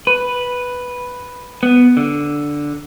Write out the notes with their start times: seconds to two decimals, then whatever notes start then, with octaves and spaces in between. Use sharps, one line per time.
0.07 B4
1.63 B3
1.97 D3